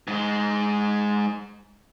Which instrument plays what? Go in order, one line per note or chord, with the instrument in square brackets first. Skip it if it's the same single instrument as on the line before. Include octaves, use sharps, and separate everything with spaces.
[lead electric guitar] G#2 G#3